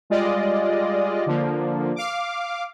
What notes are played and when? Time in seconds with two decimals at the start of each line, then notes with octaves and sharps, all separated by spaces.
0.10 G3 G#3 F4 D5 D#5
1.26 D3 F3 A#3
1.96 F5 D6